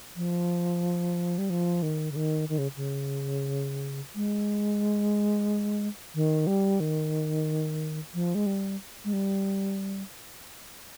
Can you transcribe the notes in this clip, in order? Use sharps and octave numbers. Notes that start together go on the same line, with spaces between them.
F3
G3
F3
D#3
C#3
D#3
D#3
C#3
C#3
G#3
D#3
G3
D#3
F3
G#3
G3
G#3
G3